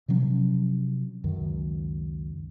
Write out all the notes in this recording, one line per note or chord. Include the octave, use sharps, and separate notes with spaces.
C3 F3 F#3 C#4
C#2 F#2 D#3